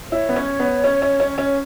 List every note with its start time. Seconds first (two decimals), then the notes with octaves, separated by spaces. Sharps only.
0.11 E4 C#5
0.29 B3
0.36 C#4
0.60 B3
0.84 C#4
1.02 C#4
1.20 C#4
1.38 C#4